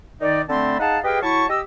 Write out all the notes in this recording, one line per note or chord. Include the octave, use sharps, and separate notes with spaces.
D#3 D#4 D5
D3 A3 C4 A5 B5 C6
D#4 G#4 F5 F#5 A5
G4 G#4 B4 D#5 F5 G5
F#3 E4 A5 C#6
G4 D#5 E6